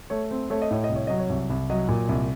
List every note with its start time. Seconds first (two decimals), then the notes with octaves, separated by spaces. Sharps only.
0.10 A3 C#5
0.31 C4
0.50 A3 C#5
0.62 D#5
0.71 A2 C#5
0.84 D#5
0.89 C2
0.96 C#5
1.07 F#3 D#5
1.19 C#5
1.30 C2
1.50 C2
1.70 F#3 D#5
1.89 A#2
2.09 C2